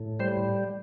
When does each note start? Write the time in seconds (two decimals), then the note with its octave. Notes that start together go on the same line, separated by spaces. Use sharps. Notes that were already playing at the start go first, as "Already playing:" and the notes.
Already playing: A2
0.20 G3 C5